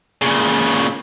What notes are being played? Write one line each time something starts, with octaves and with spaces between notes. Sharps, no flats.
A#2 C#3